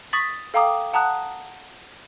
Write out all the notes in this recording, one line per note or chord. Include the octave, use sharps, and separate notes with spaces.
C#6 D#6 A6 B6 F#7
A4 F5 G5 A#5 D6 D#6
F#5 A5 A#5 D#6 F#6